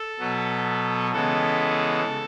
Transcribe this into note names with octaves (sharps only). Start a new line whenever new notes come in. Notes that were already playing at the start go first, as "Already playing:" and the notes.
Already playing: A4
B2 F#3 B3
C#3 E3 G#3 B3 A4